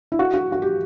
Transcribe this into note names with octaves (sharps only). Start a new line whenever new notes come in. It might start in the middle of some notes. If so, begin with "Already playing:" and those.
E4
F#4
F#4
F#4
G4